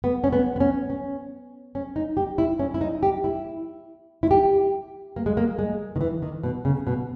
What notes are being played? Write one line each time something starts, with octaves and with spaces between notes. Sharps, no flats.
B3
C#4
B3
B3
C#4
C#4
C#4
D#4
G4
E4
C#4
E4
D#4
G4
E4
E4
G4
A#3
G#3
A#3
G#3
D#3
E3
D#3
B2
C#3
B2